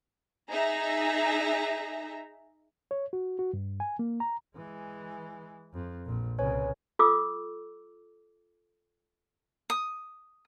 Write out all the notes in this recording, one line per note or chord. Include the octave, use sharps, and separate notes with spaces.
D#4 G#4 E5 A#5
C#5
F#4
F#4
G2
G#5
A#3
A#5
E3 G#3
F2
A#1 A#2
C2 C#3 B4 C#5 G#5
F4 A4 D6 E6
D#6